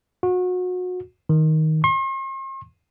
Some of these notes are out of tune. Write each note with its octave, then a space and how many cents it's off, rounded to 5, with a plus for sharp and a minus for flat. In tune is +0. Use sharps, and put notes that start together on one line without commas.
F#4 -30
D#3 +10
C6 +45